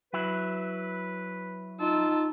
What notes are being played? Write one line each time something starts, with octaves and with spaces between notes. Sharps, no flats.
F#3 E4 B4
D#4 F4 A5 E6